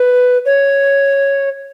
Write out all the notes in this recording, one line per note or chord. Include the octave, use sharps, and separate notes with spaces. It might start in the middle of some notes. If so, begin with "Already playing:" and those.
Already playing: B4
C#5